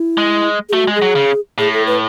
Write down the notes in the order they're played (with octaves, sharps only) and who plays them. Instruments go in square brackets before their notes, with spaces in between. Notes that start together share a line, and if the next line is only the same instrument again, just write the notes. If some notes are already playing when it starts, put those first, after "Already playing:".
Already playing: [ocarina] E4
[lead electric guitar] G#3
[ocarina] G#4
[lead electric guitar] A3 [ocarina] F#4
[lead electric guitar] G#3
[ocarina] G#4
[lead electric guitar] F#3
C#3
[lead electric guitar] A2 [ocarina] G#4
[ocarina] A4
B4